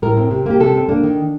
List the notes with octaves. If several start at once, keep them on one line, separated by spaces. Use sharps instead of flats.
A2 A#4
C4
C3
A#3 G4
C3 A4
C4
A#3 D4
D#3